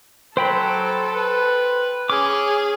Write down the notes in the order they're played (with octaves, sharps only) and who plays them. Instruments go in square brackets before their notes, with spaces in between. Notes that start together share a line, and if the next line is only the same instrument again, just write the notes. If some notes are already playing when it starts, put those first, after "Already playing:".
[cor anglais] F#3 [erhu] A4 [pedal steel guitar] C5 G5 B5
[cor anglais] B4
[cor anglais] C#4 [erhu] G#4 [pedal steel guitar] D6